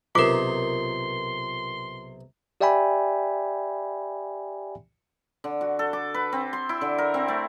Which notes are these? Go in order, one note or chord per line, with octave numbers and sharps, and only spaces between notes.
B1 C3 F4 A#4 C6 D6
G4 D5 E5 G5 G#5 B5
D3
F#4
A4
D6
B4
C4
C6
E4
D3
A#4
C4
A3